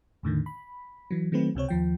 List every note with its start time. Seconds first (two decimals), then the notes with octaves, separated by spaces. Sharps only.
0.23 E2 A2 D3 D#3
0.46 B5
1.11 E3 F#3
1.32 D#3 F#3 A3 C4 B4
1.55 C#2 C3 C4 C#5
1.69 D#2 F3 G5